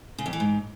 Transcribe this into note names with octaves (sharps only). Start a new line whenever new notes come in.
C#3
F2
E3
G#2